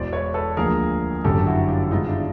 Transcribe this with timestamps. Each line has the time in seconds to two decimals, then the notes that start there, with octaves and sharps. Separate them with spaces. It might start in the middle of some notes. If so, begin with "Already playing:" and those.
Already playing: E1 E2 B2 C5 D5
0.12 B4 C#5
0.34 A4 B4
0.57 D2 D3 F3 A#3 G#4 A#4
1.24 G1 F#2 D3 G4 A4
1.46 E4 F#4
1.68 F4 G4
1.91 G2 D#3 G#3 B3 D#4 F4
2.08 D4 E4